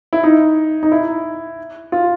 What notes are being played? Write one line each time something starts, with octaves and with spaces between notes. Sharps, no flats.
E4
D#4
D#4
E4
F4